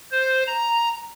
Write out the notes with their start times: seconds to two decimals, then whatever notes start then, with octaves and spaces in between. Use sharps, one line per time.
0.11 C5
0.47 A#5